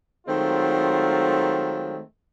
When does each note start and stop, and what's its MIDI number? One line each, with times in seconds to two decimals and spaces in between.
0.27 1.99 51
0.27 1.99 54
0.27 1.99 56
0.27 1.99 57
0.27 1.99 60
0.27 1.99 65